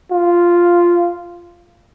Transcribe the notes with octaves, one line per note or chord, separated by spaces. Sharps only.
F4